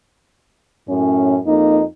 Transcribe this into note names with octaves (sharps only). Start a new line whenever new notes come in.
F#2 A2 C#4
F2 A#3 D#4